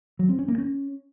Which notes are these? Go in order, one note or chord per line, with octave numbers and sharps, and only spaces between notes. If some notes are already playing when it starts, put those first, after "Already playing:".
F#3
C4
C#4
A#3
C#4